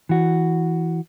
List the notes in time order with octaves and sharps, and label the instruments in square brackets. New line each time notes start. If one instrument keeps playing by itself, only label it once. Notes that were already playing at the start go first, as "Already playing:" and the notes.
[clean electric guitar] E3 F#4